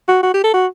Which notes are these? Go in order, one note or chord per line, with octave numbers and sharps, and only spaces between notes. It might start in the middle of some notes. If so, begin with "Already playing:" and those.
F#4
F#4
G4
A4
F#4